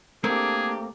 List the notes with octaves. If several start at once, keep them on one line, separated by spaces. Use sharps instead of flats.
A3 A#3 C4 D4 G4 G#4 A#4